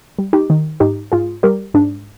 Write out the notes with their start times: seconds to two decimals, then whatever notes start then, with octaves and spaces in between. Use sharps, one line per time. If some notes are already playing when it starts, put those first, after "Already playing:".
0.18 G3
0.33 D#4 G4
0.50 D#3
0.80 G#2 D#4 G4
1.12 G#2 F4 G#4
1.43 G3 G4 A#4
1.74 G#2 D4